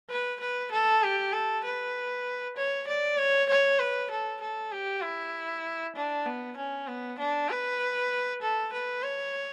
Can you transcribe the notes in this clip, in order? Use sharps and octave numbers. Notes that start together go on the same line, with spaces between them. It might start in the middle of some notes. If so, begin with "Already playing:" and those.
B4
B4
A4
G4
A4
B4
C#5
D5
C#5
C#5
B4
A4
A4
G4
E4
D4
B3
C#4
B3
D4
B4
A4
B4
C#5